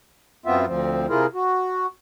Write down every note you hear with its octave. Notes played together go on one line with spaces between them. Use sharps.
F#2 B3 C4 F4 E5
D2 F3 C4
C3 E4 F4 G#4 A#4
F#4